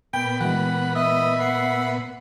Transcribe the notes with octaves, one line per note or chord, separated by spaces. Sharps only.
A#2 B3 G5 B5
E3 G#3 F#5
D#5 E5
F#5 C7